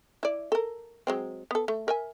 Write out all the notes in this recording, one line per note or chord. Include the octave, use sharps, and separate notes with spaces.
E4 D5
A4 A#4
F#3 G#3 C4
B3 A4
A3
A#4 E5 G#5